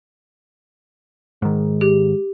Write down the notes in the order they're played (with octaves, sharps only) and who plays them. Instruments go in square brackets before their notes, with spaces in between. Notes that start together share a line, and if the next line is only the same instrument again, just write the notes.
[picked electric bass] G#2 D#3 [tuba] G#3
[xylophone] G4